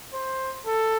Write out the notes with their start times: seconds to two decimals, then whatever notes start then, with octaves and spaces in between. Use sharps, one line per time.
0.13 C5
0.66 A4